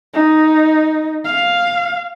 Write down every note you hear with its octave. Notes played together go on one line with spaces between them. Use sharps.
D#4
F5